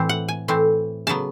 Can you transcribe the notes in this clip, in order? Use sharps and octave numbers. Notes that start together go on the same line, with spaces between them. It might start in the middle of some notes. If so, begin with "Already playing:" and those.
Already playing: A2 E3 A3 C4
F#5
G#5
A2 E3 A3 C4
C#3 F#3 B3 A5